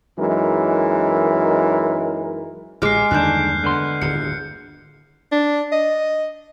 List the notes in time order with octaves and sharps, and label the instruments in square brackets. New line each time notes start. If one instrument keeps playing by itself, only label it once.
[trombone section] F#2 E3 G#3 D#4 A#4
[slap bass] A1 [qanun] G#3 D6 [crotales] F6 C7
[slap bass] E2 G2 A#3 [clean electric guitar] D3 D#3 D4 [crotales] F#6 G6
[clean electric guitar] D3 B3 C6
[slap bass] D1 G1 D#2 [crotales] C#7
[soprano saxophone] D4
D#5